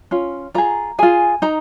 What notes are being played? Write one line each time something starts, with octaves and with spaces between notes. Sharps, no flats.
C#4 F4
F4 G#4 A#5
F4 G#4 G#5
D#4 A#5